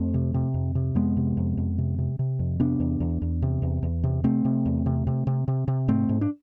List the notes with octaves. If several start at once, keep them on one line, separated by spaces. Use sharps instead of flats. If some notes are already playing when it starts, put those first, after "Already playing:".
Already playing: F2 A3 C4
C3
C3
F2
C3
F2 G#3 B3
C3
F2
F2
C3
C3
C3
F2
C3 B3 D4
E2
E2
E2
C3
E2
E2
C3
C3 A3 C4
C3
E2
C3
C3
C3
C3
C3
G#2 A3 C4
G#2
D4